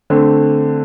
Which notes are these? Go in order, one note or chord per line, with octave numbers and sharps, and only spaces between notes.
D3 A3 C4